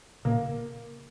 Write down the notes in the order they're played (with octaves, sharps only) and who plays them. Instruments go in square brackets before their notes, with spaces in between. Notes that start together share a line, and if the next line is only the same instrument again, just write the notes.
[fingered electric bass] A#2 C#3 [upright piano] A#3